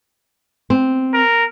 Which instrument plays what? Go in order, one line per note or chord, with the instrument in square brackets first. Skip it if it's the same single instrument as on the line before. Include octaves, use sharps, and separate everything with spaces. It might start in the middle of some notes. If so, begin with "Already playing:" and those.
[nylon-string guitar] C4
[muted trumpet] A#4